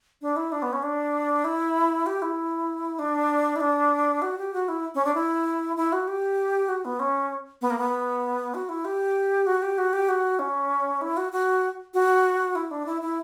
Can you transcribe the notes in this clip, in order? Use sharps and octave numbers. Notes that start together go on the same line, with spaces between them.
D4
E4
D4
B3
C#4
D4
E4
G4
E4
D4
E4
D4
F#4
G4
F#4
E4
C#4
D4
E4
E4
F#4
G4
F#4
B3
C#4
B3
A#3
B3
F#4
E4
G4
F#4
G4
F#4
G4
F#4
C#4
E4
F#4
F#4
F#4
E4
D4
E4
E4